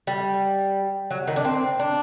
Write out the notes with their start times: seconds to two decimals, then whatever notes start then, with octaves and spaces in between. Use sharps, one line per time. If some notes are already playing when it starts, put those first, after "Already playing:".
0.07 G3
1.11 F#3
1.27 D#3
1.36 D4
1.45 C4
1.79 D4